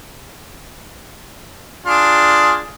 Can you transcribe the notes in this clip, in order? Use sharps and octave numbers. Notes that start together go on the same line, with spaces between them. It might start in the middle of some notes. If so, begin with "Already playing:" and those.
D4 F4 G#4